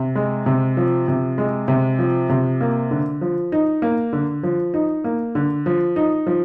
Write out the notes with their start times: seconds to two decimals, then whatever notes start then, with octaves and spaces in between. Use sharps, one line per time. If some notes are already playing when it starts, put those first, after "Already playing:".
Already playing: C3
0.15 G#3
0.46 C3
0.77 F3
1.08 C3
1.38 G#3
1.68 C3
1.99 F3
2.29 C3
2.61 A#3
2.91 D3
3.21 F3
3.52 D#4
3.82 A#3
4.13 D3
4.43 F3
4.74 D#4
5.04 A#3
5.35 D3
5.66 F3
5.96 D#4
6.27 F3